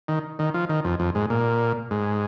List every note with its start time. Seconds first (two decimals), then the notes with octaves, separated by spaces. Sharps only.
0.08 D#3
0.39 D#3
0.54 F3
0.70 D#3
0.85 F2
1.00 F2
1.15 G#2
1.30 A#2
1.91 G#2